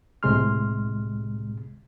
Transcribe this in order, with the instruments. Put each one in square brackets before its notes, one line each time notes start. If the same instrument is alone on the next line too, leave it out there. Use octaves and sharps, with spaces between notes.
[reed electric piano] C2 A2 C3 G#3 C6 F6